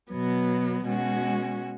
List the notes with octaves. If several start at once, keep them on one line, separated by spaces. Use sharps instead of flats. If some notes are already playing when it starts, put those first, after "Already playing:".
B2 F#3 B3
B2 G#3 C#4 F#4